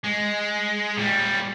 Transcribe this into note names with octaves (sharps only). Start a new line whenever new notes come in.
G#3
A#2 G3